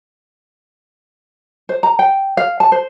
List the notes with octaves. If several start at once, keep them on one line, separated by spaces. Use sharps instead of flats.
C5
A#5
G5
F5
A5
C5